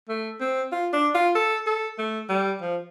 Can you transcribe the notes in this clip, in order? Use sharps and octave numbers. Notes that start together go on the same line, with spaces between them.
A3
C4
F4
D4
F4
A4
A4
A3
G3
F3